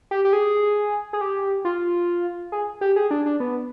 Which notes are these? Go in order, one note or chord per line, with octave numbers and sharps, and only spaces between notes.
G4
G4
G#4
G#4
G4
F4
G#4
G4
G#4
D4
D4
B3